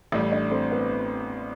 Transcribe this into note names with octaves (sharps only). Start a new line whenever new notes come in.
A1 A2 G3 E4 E5
D4 D5
C4 C5
B3 B4